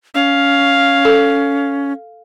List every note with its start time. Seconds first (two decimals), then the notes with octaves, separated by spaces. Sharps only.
0.15 C#4 F5
1.05 A4